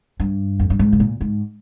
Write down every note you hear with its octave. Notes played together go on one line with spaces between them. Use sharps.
G2
F2
G2
G#2
C3
A#2
G#2